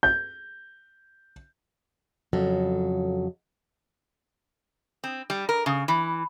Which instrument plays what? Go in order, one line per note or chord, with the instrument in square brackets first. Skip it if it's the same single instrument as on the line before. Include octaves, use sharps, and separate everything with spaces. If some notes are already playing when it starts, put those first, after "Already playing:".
[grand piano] G6
[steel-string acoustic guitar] F2 C#3 F#3 A4
[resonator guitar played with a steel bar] C4
G3
A#4
C#3
E3